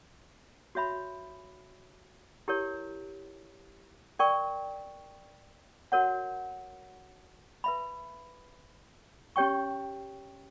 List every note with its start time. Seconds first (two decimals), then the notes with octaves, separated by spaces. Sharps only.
0.75 F#4 C#5 E5 B5
2.48 E4 G4 A#4 C#5
4.19 A#4 D5 G5 C#6
5.92 F#4 A#4 C#5 F#5
7.64 B4 E5 B5
9.36 C#4 G4 C#5 G5 C#6